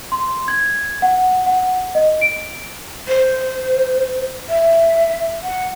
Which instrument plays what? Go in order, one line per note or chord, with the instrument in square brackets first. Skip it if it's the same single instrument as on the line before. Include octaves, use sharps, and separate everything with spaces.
[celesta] C6
G#6
F#5
F#5
D#5
D7
[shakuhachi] C5
E5
F#5